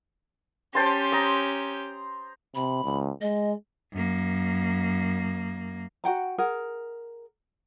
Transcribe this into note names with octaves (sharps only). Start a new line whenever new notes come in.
C#4 G4 C5 A5 C6
A#5 D#6
C3 B5
C#2
G#3 D#5
F#2 A#3
F#4 F#5 G5 A#5
G#4 A#4 F#5